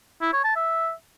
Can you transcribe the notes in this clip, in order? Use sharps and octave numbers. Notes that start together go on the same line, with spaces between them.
E4
C#5
A5
E5